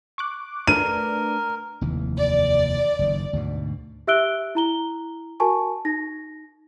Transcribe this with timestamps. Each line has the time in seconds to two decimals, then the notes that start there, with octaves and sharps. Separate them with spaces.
0.18 C#6 D6 F#6
0.67 A3 D4 A#4 B4 D#7
1.81 F1 D#2 E3
2.19 D5
2.99 F#1 D#3
3.33 D2 G#2 B2
4.07 G4 E5 E6 F#6 D7 G7
4.55 E4 A#5 G7
5.40 F#4 A#4 G#5 A5 C#6
5.85 D#4 A#6